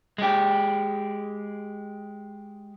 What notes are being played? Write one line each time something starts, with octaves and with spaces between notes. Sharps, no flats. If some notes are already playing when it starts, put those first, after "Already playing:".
G#3 G4